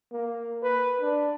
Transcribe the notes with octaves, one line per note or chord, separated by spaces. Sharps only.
A#3
B4
D4